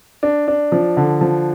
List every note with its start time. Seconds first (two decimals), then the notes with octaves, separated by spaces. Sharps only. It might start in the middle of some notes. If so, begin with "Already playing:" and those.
0.23 D4
0.48 D4
0.72 F3
0.97 D3
1.21 F3